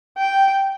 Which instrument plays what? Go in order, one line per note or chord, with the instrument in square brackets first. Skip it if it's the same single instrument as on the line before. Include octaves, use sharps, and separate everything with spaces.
[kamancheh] G5